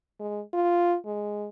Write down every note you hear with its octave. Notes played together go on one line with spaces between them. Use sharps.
G#3
F4
G#3